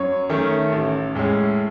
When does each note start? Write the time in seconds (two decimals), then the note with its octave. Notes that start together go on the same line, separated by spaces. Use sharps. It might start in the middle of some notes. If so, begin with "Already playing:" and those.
Already playing: F#2 C#5
0.29 D#3 A3 C#4
0.72 A1
1.15 A2 G#3 C#4